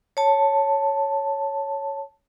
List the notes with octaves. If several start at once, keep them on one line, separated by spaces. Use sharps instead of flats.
C#5 A5